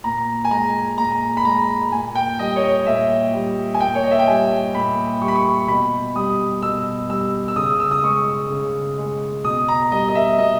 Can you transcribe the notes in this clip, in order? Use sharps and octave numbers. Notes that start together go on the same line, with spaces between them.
A#2 A#5
G#5
G#3 A#5
A#2 A#5
B5
G#3 A#5
A#2 G#5
G5
G3 D#5
C#5
D#5
A#2 E5
G3
G#5
A#2 G5
C#5
D#5
E5
G5
G3 G#5
A#2 B5
G3 C#6
B5
C#6
B2 B5
G3 D#6
B2 E6
G3 E6
E6
C#3 D#6
E6
D#6
G#3 C#6
C#3
G#3
B2 D#6
A#5
G3 D#5
D#5
E5
B2 D#5